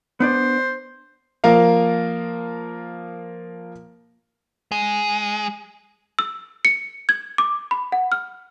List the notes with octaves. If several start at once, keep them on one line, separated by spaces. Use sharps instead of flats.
B3 D4 C5 D5
F3 A#3 A#4 F5
G#3
E6
C#7
G#6
D6
B5
F#5
F6